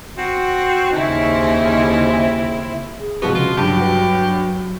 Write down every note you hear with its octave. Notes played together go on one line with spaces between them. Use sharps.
C4 F#4
D#2 C#3 C4 C#4 D#4 E4
G#4
C2 F3 G#3 B3 F#4
C#3 F4
G2 F#3 G4 A5
F#4 B4